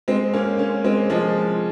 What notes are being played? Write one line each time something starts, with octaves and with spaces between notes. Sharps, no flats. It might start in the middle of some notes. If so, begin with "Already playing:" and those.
G#3 C4
A#3 C#4
A#3 C#4
G#3 C4
F3 G#3